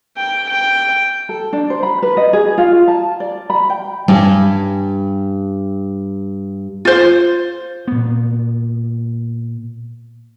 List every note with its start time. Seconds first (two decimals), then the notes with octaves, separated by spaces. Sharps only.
0.18 G5
0.49 G5
1.29 A4
1.53 D4
1.70 C5
1.83 B5
2.03 B4
2.17 D#5
2.33 G#4
2.58 F4
2.88 A5
3.20 D5
3.50 B5
3.70 G5
4.08 G2 G3 G#5
6.85 F4 C5
7.88 A#2 B3